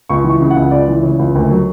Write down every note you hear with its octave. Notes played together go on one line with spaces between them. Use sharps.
C#2 C#6
E3
C#6
C#3
F#5
C#2
C#2 D5
E3
C#3 C#5
C#2
D2 A#4
F#3